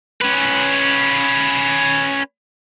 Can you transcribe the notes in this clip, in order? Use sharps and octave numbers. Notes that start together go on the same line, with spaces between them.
C#4 B4